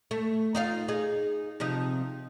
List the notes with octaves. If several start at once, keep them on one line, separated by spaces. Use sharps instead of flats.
A3
D#4 F4 F5
D#4 G#4
C3 F3 D#4